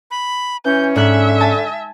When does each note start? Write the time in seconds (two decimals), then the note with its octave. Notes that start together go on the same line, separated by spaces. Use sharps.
0.11 B5
0.65 E3 C#4 G6
0.96 G#2 D3 E5 F#6
1.40 G#5 A5